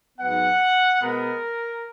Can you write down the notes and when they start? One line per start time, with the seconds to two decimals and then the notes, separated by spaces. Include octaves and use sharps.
0.18 G#2 F#3 B3 F#5
1.00 B2 G#3 B3 A#4